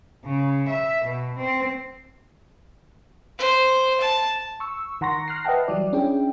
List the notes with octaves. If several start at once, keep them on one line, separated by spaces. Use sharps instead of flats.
C#3
E5
B2
C4
C5
A5
C#6 E6
D#3 F#5 A#5 C6 C#6 A#6
F6 F#6 A#6 C7
B4 D#5 E5 F#5 G5 A5
E3 F#3 G3 E4 D5
C#4 D4 E4 G#4 G5